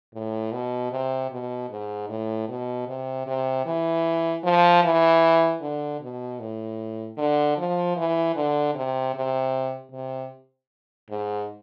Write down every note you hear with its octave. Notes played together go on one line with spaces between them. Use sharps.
A2
B2
C3
B2
G#2
A2
B2
C3
C3
E3
F3
E3
D3
B2
A2
D3
F3
E3
D3
C3
C3
C3
G#2